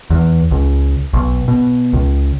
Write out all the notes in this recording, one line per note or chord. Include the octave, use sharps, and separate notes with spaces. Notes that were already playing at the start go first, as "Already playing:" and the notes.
E2
C#2
B1
B2
C#2